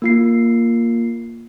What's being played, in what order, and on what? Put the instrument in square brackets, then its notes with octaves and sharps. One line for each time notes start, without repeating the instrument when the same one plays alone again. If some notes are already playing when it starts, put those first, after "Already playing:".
[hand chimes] A#3 F4 C7